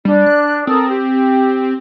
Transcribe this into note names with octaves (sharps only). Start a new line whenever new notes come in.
G3 D4
F#6
C4 A4 A#4 D#6
G4